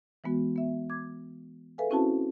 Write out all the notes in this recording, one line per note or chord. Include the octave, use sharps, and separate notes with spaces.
E3 G#3 B3 F#4
B3 E5
D6 G#6
G#4 A4 B4 E5 F5 G#5
C4 C#4 E4 F#4 C5 A5